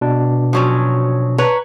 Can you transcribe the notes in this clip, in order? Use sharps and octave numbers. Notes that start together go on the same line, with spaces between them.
B2 D4
F3 F#3 C#4
B4 C#5 A#5